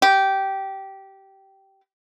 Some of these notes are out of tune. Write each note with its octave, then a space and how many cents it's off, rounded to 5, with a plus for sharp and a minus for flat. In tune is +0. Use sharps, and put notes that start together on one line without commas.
G4 -15